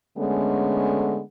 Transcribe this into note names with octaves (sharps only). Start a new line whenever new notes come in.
D3 G#3 A3 B3 C#4